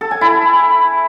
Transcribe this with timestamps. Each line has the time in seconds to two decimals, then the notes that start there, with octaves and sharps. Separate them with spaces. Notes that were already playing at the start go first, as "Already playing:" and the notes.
0.01 A4
0.11 G#5
0.21 E4